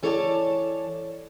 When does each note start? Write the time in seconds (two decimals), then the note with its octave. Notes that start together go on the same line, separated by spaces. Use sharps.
0.03 E3 A4 C#5 D5 G5 A5